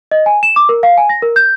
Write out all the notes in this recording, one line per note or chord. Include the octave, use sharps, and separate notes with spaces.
D#5
G#5
E7
D6
A#4
F5
G#5
A#6
A#4
G6